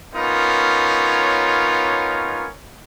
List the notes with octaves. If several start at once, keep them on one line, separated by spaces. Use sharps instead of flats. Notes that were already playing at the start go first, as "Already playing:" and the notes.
B3 C#4 D#4 F4 A#4 C#5